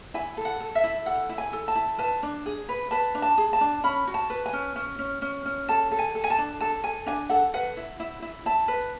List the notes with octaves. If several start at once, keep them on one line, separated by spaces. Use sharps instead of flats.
E4 G#5
A4
F#5
A4
E5
E4
A4 F#5
E4
G#5
A4
A5
E4
B4 A5
D4
G#4
B4
B4 A5
D4
A5
G#4
A5
D4
C#4 B5
F#4
A5
B4
G#5
C#4
C#4
C#4
C#4
C#4
A4 A5
A4
G#5
A4
G#5
A5
D4
A4 A5
A4 G#5
D4 G#5
A4 F#5
B4 F#5
E4
E4
E4
E4 A5
B4